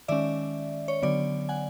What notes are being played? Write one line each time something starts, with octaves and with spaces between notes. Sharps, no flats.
D#3 G#3 C#4 D5 E5
C#5
D3 F#3 B3 D5
F#5 G#5